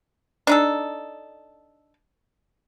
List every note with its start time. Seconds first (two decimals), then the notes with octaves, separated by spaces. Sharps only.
0.47 D4 D#4 A4